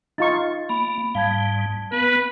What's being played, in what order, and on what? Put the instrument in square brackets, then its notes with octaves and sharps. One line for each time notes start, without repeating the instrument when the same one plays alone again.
[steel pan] D#4 F4 C#6 [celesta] A6
[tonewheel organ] A#3 [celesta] B5
[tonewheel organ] G#2 G3 [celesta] F5 A5 G#6
[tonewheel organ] B3 [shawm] B4